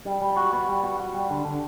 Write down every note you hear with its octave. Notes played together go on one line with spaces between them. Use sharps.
G3
G3
F#4
B3
G3
F#4
F#4
G3
D3
D3